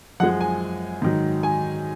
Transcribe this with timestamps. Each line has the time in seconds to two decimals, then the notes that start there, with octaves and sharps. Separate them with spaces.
0.20 F#2 F3 G#3 F#5
0.41 G#5
1.02 G#2 D#3 F#3
1.43 G#5